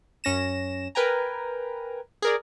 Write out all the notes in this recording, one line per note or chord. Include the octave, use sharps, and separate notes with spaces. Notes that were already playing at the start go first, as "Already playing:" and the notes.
F#2 C#4 A#6 E7
A#4 B4 G5 G#5 A#5
G#4 A#4 D5